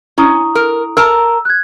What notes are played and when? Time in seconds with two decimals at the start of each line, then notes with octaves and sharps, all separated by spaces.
0.18 C#4 E4 A#5 D#6
0.55 A#4
0.97 A#4 A5 A#5 E6
1.45 F#6 G#6